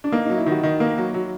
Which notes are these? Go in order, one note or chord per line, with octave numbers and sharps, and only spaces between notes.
D4
A#3 D#4
D#4
F#3
E4
D#3 F#4
D#3
A#3
F#3
F#3